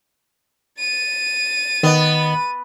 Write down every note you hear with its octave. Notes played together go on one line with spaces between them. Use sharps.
A6 D#7
D#3 B3 D#5